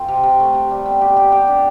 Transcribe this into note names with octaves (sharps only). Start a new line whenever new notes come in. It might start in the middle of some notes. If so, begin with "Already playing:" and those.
Already playing: C4 F4 A4
C3
C3
A3
C3
G3
B3
G4
G4
G4
D4